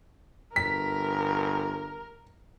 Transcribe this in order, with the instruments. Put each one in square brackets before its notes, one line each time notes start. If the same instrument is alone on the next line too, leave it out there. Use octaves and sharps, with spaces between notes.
[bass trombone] G1 [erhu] A#4 [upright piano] B6